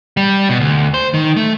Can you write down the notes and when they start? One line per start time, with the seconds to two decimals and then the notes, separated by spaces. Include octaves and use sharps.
0.17 G3
0.49 B2
0.60 D2
0.94 C5
1.14 D#3
1.37 A3